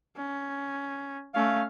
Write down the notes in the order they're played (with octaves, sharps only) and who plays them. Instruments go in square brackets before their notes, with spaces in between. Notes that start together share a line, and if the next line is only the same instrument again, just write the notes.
[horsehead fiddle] C#4
[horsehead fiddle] A3 C#4 [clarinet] F5